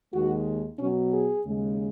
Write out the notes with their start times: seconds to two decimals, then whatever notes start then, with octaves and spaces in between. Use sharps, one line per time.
0.12 D#2 D#3 G#3 F#4
0.78 B2 F#3 C#4
1.11 G#4
1.44 D#2 C#3 G#3